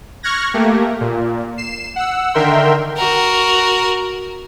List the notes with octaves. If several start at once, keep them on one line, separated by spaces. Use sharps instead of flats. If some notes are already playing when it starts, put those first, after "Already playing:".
C#6 F6 F#6 G#6 A#6
A3 A#3 G4
A#2
C7 E7
F#5 E6
D3 D#3 A#4 E5 G5 C6
F#4 A#4